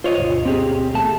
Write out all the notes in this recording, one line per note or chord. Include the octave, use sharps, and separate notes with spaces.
F4 C5 C#5 D#5
D2 G2 B2
C4 G4 G#4
E2 A3 A5